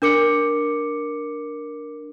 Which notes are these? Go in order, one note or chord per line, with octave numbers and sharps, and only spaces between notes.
D4 A#4 D6 C#7